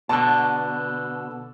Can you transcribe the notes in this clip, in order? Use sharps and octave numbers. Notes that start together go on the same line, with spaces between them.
B2 D3 A5